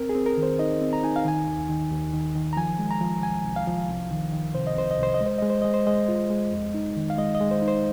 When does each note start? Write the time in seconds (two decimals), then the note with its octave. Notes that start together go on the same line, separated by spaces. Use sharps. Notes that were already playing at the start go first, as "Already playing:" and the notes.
Already playing: C4 A#4
0.09 G#4
0.15 C4
0.26 A#4
0.37 D#3
0.43 C5
0.59 D#4 D#5
0.81 C4
0.93 A#5
1.04 D#4 G#5
1.16 F5
1.25 D#3 G#5
1.47 D#2
1.69 D#3
1.91 D#2
2.13 D#3
2.35 D#3
2.53 A#5
2.57 F3 G#5
2.79 G#3
2.91 A#5
3.01 F3
3.23 C2 G#5
3.45 C2
3.56 F5
3.67 F3
3.88 C2
4.11 D#3
4.32 D#3
4.55 C3 C5
4.67 D#5
4.77 C2 C5
4.91 D#5
4.98 C2 C5
5.14 D#5
5.21 G#3
5.26 C5
5.38 G#3 D#5
5.50 C5
5.62 G#3 D#5
5.74 C5
5.87 G#3 D#5
6.09 F4
6.30 G#3
6.52 F2
6.74 D#4
6.96 D#3
7.10 F5
7.18 G#3 D#5
7.35 D#5
7.41 G#3
7.51 C5
7.62 D#4
7.68 C5